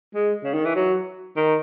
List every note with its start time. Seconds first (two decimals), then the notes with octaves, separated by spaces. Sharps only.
0.14 G#3
0.43 C#3
0.54 D#3
0.65 E3
0.75 F#3
1.36 D#3